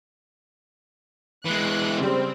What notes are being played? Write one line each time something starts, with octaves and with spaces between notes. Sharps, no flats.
E3 G#3 F#6
C#3 G3 C4